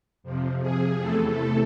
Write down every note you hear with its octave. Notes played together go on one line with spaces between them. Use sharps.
F2 C3 F3
G#4
E2 C3 E3 A3 A4